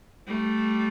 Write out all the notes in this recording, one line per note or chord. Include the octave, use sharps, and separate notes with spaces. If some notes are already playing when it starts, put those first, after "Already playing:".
G3 A3